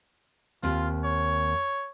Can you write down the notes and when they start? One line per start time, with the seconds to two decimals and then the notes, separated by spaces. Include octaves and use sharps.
0.63 D#2 C4 F4
1.04 C#5